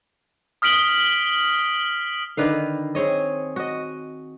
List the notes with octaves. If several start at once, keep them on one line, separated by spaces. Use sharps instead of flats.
D#6 F6 B6 D7 F#7 G7
D3 D#3 B4 F5
C4 G#4 C#5 D#5
F#4 D#5